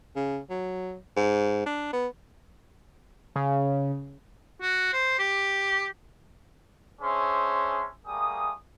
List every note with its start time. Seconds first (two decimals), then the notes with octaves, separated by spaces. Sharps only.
0.16 C#3
0.50 F#3
1.17 G#2
1.66 D4
1.93 B3
3.36 C#3
4.62 F#4
4.93 C5
5.19 G4
7.02 C#4 D4 G#4 C5 E5 C6
8.06 G3 A3 A#3 G#4 D#6